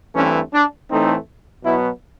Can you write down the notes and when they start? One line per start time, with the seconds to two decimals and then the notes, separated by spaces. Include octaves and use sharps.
0.15 G2 E3 A3 C4 C#4
0.53 D4
0.89 A2 E3 A3 C4 D#4
1.63 B2 F#3 B3 E4